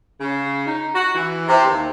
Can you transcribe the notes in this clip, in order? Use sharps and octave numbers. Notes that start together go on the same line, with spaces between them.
C#3
D#4
F#4
E3
C3
D#2